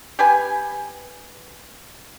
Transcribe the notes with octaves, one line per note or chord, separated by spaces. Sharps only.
G4 B4 G#5